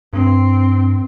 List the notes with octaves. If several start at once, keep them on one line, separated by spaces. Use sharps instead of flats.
G2 C4